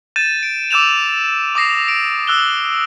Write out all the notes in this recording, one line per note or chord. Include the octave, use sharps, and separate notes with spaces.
G6 A6 D#7 E7
D7
D6 E6 G6 E7 F7
D6 D#6 A#6 C7
D7
E6 F#6 G7